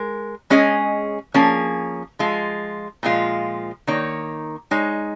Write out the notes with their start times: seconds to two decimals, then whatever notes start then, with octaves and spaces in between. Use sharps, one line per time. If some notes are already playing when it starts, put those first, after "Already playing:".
Already playing: G#3 A#4
0.50 G#3 C#4 G#4 D#5
1.34 F3 A#3 C#4 G#4
2.19 F3 G#3 F4
3.03 A#2 F3 G#3 F4
3.87 D#3 A#3 D#4 C#5
4.71 G#3 D#4 C#5